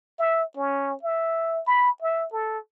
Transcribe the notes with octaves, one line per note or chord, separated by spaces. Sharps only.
E5
C#4
E5
B5
E5
A4